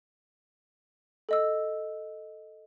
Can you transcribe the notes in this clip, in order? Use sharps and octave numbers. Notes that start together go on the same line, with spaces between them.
A4 D#5 E6